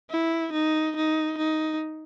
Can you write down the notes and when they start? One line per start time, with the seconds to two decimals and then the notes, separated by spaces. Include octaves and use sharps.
0.10 E4
0.52 D#4
0.96 D#4
1.38 D#4